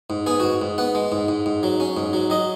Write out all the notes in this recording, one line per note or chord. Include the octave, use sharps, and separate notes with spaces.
G#2
B3 G#4
G#2 F#4
G#2
B3 F#5
G#3
G#2
G#2
G#2
F#3
C#4
G#2
F#3
F#3 D#5